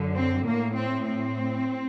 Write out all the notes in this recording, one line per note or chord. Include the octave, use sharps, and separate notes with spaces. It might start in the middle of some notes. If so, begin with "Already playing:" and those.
Already playing: F#2 D3
C4
A2 A#3
C4
C4